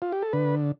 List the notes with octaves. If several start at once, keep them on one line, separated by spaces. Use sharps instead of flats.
F4
G4
A4
D3 B4